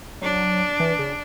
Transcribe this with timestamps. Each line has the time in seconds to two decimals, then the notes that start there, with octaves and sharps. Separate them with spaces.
0.21 F#3 D4
0.80 E3
0.99 C#3